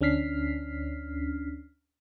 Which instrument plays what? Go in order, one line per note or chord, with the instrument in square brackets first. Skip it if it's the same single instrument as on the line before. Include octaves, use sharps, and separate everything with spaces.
[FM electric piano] D2 C#4 D4 F6 B6 C7